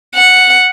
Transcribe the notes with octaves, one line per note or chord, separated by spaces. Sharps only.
F#5